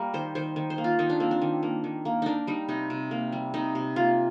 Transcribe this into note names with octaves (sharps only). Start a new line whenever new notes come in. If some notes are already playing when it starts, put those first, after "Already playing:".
Already playing: G3 A#3 A#4
D#3 C5
D#3 C5
D#3
C5
A#3
F4
D#3 D#4
D4
A#3 C4
D4
D#3
A#3
D#3
A#3
A#3 D4 D#4
G3 D#4
C3 D#4
C3
A#3
G3
C3 D#4
C3
A#3 F4